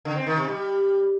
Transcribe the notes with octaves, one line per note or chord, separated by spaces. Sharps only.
D3
C4
D#3
C3
G3